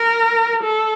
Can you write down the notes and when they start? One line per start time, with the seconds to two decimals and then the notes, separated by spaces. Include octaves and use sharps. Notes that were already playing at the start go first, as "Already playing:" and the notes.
Already playing: A#4
0.63 A4